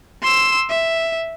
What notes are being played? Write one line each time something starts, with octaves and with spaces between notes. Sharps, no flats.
C6 E6
E5